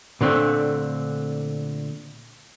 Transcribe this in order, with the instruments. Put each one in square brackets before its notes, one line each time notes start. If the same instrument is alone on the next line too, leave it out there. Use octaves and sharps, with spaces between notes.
[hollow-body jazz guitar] A#2 D3 A3 C4